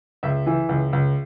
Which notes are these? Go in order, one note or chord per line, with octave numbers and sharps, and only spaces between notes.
C#2 E5
E3
C#2
C#2